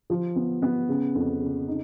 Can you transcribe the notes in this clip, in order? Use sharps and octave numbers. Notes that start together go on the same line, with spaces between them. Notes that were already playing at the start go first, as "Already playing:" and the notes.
F3
B3
B3
C#3
F2
C#3
D#4